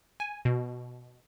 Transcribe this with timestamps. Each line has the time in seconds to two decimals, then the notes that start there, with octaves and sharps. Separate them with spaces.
0.20 G#5
0.45 B2